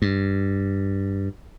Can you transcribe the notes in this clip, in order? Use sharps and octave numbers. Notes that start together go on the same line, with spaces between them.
G2